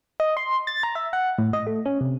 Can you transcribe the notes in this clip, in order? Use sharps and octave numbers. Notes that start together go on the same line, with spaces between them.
D#5
C6
A6
A#5
E5
F#5
A2
D#5
A3
C#4
C3